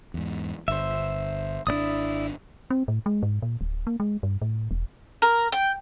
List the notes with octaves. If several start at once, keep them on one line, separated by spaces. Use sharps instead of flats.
E2 G#2
G1 C5 E5
G#1 C#3 D4 E4 D5 D#6
C4
A2
G#3
G#2
A#2
D1
A#3
G#3
G2
A2
E1
A#4
G5